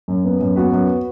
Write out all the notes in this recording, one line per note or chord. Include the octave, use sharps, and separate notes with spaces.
F#2
B3
F#2
B3 F#4 B4
F#2